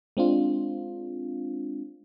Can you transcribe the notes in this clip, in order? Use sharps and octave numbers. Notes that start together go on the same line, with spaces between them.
G#3 C4 D4 F4